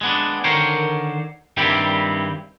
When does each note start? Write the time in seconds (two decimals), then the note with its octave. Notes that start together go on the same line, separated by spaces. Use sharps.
0.01 G#3 B3 D4
0.44 D3 D#3 A#4 C5 C#5 G5
1.57 G2 D#3 G3 C4 E4 G4